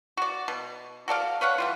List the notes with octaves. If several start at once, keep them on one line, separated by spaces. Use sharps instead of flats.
F#4 D5
B2
F#4 A4 D5 F5
B4 C#5 F5 F#5
E3 G3 F4